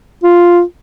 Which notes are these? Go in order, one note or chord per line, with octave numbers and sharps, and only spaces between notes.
F4